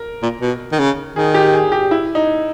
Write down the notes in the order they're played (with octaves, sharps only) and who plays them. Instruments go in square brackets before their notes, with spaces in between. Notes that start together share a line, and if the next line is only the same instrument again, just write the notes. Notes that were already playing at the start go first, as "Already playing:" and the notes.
Already playing: [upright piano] A#4
[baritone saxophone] A#2
B2
D#3
C#3
[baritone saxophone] D#3 [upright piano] G#4
[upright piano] G4
G#4
G4
E4
D#4